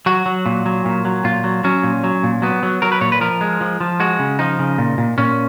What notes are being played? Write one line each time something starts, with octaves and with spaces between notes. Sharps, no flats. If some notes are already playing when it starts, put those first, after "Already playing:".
F#3 F#4
F#3
A#2
F#3
A#2
F#3
A#2 F4
F#3
F#3 C#4
A#2
F#3
A#2
F#3 B3
F#3
F#3 A#4
B4
A#2 C#5
B4
F3 A#4
G#3
F3
F3
G#3 F#4
C#3
F3 D#4
C#3
A#2
A#2
A#2 C#4